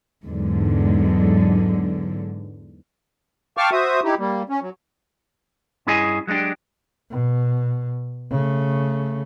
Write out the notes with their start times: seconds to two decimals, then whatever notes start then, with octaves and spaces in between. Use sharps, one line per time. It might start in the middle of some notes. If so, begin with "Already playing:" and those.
0.25 E2 G#2 D3 F#3
3.57 F5 G5 A5 C#6 D6 F6
3.72 F#4 C5 E5 D#6
4.04 D#4 E4 G4
4.19 G3 A#3
4.49 C#4
4.62 F#3
5.87 G2 C#4 E4 G#4 D#5 G#5
6.27 F#3 G#3 B3 D4 G4
7.11 B2
8.30 C#3 A3